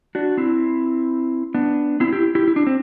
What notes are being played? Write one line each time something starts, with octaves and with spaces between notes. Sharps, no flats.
D4 F#4
C4 E4
B3 D4
C4 E4
E4 G4
E4 G4
E4
D4
C4